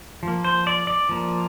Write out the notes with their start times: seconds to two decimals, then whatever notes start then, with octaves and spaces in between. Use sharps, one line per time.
0.23 F3 A#3
0.44 C5
0.67 D5
0.87 D5
1.09 F3 A#3